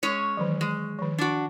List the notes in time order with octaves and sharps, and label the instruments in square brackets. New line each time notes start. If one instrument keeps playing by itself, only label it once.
[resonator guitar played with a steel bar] G#3 C#4 C#5
[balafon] D#3 E3 F#3
[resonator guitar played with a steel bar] G#3
[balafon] D#3 F3
[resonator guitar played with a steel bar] D4 F#4